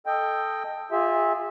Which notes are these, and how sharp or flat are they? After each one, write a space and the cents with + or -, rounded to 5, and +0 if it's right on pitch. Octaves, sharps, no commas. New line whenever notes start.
A4 +0 D#5 +0 G5 +10
F4 +10 G#4 -30 E5 -15